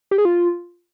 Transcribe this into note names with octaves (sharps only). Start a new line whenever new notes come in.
G4
G#4
F4